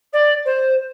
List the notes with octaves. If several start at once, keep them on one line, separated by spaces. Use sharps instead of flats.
D5
C5